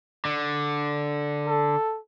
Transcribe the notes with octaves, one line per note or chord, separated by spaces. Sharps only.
D3
A4